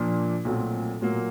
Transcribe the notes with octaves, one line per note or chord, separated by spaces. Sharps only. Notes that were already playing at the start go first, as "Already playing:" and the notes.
Already playing: A#2 F3 A#3 D4
B1 A#2 F#3 A3 C4
A#2 F#3 A#3